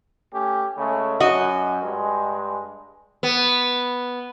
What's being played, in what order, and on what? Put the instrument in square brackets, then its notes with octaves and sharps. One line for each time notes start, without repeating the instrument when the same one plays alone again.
[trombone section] A3 C#4 G4
C#3 G#3 A3
[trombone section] F#2 [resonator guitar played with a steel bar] F#4 D#5
[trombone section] G2 G#3
[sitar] B3